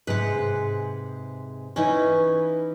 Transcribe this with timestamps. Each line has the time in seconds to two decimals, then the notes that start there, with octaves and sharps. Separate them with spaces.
0.07 G#2 C3 G#3 B4 F#5
1.76 E3 C#4 D#4 E4 B4